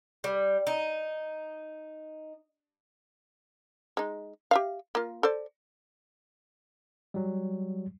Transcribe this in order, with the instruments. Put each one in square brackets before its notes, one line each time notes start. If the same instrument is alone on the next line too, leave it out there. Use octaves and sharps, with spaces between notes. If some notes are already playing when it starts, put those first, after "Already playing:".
[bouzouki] G3
D#4
[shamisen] G#3 D#4
G4 E5 F5
A#3 F4
A4 C5 D5
[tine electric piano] F#3 G3